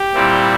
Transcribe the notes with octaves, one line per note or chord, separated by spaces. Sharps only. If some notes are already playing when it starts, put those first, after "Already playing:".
Already playing: G4
A#2 G3 C4 E4